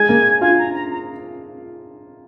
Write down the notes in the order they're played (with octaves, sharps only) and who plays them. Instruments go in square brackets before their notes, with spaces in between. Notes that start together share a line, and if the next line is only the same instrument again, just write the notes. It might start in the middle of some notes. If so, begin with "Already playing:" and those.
Already playing: [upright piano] G#3 G#4 [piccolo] G#5
[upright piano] A#3 A#4
[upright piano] F4 F5 [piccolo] G#5
[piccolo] A#5
A#5
A#5